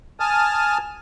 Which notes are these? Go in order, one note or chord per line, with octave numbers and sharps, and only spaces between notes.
G#5 A5 D#6 F6